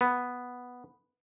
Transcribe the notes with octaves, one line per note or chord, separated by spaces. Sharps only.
B3